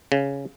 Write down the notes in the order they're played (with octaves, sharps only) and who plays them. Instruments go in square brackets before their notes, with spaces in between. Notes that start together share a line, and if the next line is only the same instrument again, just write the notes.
[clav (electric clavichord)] C#3